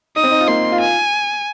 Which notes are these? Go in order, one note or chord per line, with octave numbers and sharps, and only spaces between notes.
D#4 D#6
C4
D#4
F4
A#3 C6
F4
G#5